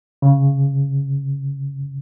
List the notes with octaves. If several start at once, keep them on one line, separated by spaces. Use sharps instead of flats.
C#3